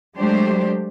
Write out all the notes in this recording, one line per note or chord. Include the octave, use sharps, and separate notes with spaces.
F#3 G#3 A3 D4 G4 C5